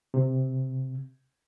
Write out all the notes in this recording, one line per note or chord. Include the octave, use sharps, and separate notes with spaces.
C3